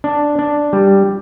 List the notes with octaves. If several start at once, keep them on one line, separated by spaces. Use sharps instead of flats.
D4
D4
G3